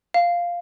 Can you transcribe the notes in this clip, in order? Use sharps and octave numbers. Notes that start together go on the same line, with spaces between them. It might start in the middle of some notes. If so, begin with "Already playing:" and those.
F5